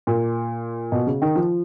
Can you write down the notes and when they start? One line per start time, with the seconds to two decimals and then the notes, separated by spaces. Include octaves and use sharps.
0.07 A#2
0.92 B2
1.07 C#3
1.22 D#3
1.35 F3